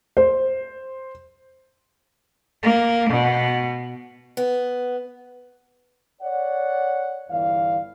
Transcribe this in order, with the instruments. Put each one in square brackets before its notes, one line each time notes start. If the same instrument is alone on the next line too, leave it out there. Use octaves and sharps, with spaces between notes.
[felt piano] C5
[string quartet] A#3
B2
[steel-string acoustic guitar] B3
[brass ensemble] C#5 D5 F#5
G1 E2 E3 D5 F5